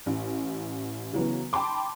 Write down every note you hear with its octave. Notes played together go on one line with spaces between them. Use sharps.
A1
C#3 E3 F#3 B3
G5 A5 B5 C6 D6